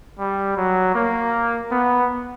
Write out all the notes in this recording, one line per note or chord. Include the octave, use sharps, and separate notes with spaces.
G3
F#3
A#3
B3